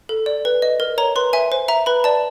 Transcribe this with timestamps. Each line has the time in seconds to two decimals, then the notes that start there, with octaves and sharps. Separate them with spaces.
0.09 A4
0.26 D5
0.45 B4
0.62 D#5
0.80 A#4
0.98 C#5 A#5
1.16 B4 C6
1.33 E5 G#5
1.52 C5
1.68 E5 A#5
1.86 B4 B5
2.04 D5 A5